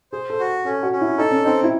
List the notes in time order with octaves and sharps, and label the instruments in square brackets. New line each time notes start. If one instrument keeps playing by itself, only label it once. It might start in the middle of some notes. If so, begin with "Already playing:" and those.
[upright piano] G#4 [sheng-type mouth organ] C5
[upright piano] A4
[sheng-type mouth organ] F#4
[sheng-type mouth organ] C#4 [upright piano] A4
[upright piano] F#4
[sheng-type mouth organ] C#4
[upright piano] E4
[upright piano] D#4 [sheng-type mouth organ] A4
[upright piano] C#4
[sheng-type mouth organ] C4 [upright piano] D#4
[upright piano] E4